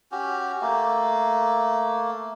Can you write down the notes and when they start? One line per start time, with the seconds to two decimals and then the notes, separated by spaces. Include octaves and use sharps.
0.11 C#4 F#4 G4
0.61 A3 A#3